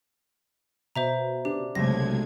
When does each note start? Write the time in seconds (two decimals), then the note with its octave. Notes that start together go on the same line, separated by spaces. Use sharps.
0.96 B2 C5 E5 A#5
1.45 D4 G4
1.75 B1 C3 F#3 G#3 A3 G#6 A#6